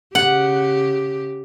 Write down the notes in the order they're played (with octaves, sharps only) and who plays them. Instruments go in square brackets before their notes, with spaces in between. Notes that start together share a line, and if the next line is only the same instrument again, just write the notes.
[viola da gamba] C#3 G4 [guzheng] F#5